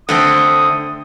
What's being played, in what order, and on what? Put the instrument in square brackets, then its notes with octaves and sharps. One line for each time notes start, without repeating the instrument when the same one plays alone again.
[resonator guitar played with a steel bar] D3 A3 C4 [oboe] D#6